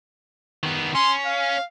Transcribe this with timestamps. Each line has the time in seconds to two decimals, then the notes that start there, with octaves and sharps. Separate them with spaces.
0.63 D#3 B3
0.95 C#4 C6
1.25 F5